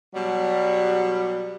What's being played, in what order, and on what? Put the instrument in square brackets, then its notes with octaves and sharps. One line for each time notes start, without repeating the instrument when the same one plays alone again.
[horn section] B2 F#3 G3